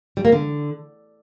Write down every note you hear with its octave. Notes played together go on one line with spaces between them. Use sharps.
G3
A#3
D3